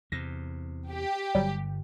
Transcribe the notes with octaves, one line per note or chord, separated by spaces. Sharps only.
E2 C3 A#6
G4
G1 F#3 G3